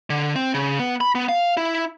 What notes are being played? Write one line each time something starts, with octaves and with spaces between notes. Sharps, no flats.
D3
C4
C#3
B3
B5
B3
F5
E4